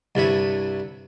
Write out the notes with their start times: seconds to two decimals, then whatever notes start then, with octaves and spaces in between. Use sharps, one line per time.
0.15 C2 G2 E4 C#5